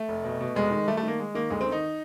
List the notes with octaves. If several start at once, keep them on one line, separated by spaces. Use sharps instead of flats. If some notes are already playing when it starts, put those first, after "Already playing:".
Already playing: A3
F1
B2
B2
F1 G#3
D#3
G3 A3
A3
D#3 A#3
G#3
D#3 A#3
D2 G#3
C4
D#3
D#4